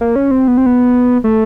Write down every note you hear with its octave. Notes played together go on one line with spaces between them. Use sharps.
A#3
C#4
C4
B3
C4
B3
A3